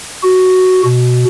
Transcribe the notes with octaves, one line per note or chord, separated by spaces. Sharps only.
F#4
B2